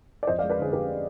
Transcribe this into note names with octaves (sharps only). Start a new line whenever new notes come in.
D5
F2 C5 D#5
D5 F5
G#3
B4 D5
D3 G#4 C5
F2 G4 B4